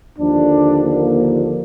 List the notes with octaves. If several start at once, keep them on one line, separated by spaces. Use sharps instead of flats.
D#2 D3 F3 D4
A#3